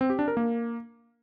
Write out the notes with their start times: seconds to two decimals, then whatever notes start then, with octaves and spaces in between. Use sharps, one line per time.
0.01 C4
0.10 G4
0.19 D4
0.28 A#4
0.37 A#3